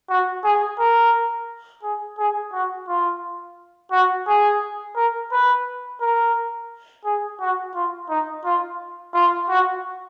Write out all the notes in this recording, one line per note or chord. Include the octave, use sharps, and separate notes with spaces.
F#4
G#4
A#4
G#4
G#4
F#4
F4
F#4
G#4
A#4
B4
A#4
G#4
F#4
F4
D#4
F4
F4
F#4